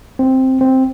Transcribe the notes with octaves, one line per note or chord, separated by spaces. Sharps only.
C4
C4